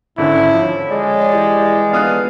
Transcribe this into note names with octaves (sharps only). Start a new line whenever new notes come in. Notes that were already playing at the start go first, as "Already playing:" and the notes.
G#1 G#2 D3 C#4 E4
D2 D3 F3 C#5
G#3 D5
E3 G3 E4 G4
F3 A3 B3 D4 F5 D#6 F#6